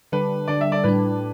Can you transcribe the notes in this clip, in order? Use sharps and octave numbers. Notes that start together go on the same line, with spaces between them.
D3 G3 D4 B4
D3 G3 D4 D5
E5
D5
A2 G3 D4 B4